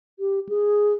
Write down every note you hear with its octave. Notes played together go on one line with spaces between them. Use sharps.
G4
G#4